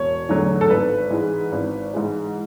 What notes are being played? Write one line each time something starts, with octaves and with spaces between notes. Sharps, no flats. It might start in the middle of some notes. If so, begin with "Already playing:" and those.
Already playing: E1 C#5
E2 D3 F#3 A3
A4
G#1 B4
G#2 E3 G#3
G#1
G#2 E3 G#3